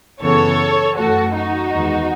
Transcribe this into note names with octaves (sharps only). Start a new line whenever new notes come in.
F#2 C#3 E3 B3 A4 C#5
F#2 E3 A3 F#4 A4
D#4 F#4
E2 D#3 G#3 B3